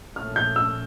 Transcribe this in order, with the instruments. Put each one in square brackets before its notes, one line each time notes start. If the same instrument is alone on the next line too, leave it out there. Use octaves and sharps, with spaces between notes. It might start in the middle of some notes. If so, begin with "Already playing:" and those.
[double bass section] A#1 A#2 A3 C#4 [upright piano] F6
[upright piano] G6
E6